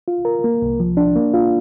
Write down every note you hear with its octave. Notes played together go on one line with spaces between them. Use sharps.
F4
A#4
A#3
C2
F3
D4
A#3
F4